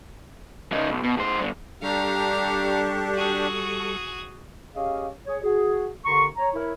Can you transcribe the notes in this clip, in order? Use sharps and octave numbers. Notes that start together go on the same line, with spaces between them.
C#3 D#4
B1
B2
A2 C5
G2 D3
G3 D4 G4 A4 F5 A#5 C#6
F#4 G#4
C#4 G4 G#4 D#5 F5
G#4 C#5
F#4 G#4
D#2 D3 A#5 C6 C#6
C#5 A#5
E4 A#4 C#5